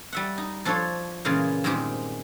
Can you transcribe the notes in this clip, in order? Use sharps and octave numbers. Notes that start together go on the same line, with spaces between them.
G3 E5 F#5
D#4
F3 D4 A4 C5 C#5
A#2 C#3 E3 G#3 F4
G2 A#2 D#3 G#3 C4 G4